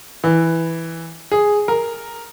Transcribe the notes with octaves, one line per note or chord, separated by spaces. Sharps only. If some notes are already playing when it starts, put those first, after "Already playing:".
E3
G#4
A#4